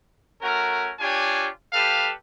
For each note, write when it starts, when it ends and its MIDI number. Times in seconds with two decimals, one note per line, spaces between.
0.42 0.92 57
0.42 0.92 61
0.42 0.92 66
0.42 0.92 70
1.00 1.47 62
1.00 1.47 65
1.00 1.47 67
1.00 1.47 73
1.00 1.47 80
1.73 2.12 55
1.73 2.12 67
1.73 2.12 69
1.73 2.12 71
1.73 2.12 77